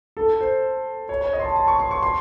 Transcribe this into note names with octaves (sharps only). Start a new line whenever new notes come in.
A4
C5
C#5
C#5
D#5
C6
A5
A5
C#6
C6
C#6
C6